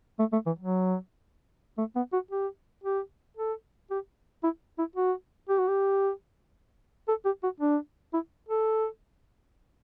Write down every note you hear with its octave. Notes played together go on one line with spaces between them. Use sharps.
A3
A3
E3
F#3
A3
B3
F#4
G4
G4
A4
G4
E4
E4
F#4
G4
F#4
G4
A4
G4
F#4
D4
E4
A4